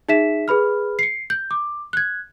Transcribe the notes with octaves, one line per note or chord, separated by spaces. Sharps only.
D#4 G#4 E5 B6 E7
G#4 B4 B5 F6
C7 C#7
G6
D6
F#6 G#6